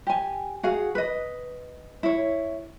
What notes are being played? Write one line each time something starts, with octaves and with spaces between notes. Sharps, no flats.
G4 G#5
F#4 G#4 F5 F#5
B4 D#5
E4 C#5